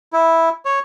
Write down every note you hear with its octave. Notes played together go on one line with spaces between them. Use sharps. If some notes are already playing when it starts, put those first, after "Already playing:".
E4
C#5